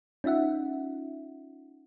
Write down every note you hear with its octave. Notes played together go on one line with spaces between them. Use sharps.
C#4 D#4 F4 E5 F#5